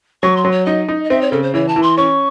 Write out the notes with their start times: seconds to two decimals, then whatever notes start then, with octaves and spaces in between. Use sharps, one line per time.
0.23 F#3 C#6
0.37 C6
0.45 F#3
0.51 C#5
0.66 D#4 D#5
0.88 D#4
1.04 D#5
1.10 C4 E5
1.21 C#5
1.32 C#3 A4
1.43 C5
1.54 E3 C#5
1.68 A5
1.76 E3
1.83 C6
1.97 C#4 C#6